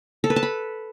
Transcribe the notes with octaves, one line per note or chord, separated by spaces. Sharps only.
A4
B4
A5
B5